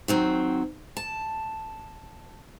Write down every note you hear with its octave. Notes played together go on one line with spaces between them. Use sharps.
D#3 F#3 C4
A5